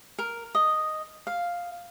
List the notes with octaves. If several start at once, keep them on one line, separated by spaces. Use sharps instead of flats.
A#4
D#5
F5